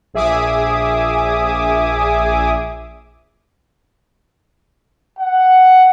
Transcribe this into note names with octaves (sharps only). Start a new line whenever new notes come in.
A#1 G#4 E5 G#5 D6 D#6
F#5